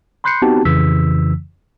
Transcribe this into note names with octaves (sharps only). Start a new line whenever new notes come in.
B5 C6 F#6 G6 C7 C#7
B3 C4 D#4 F#4 G4 A5
F2 C#3 E3 E6 B6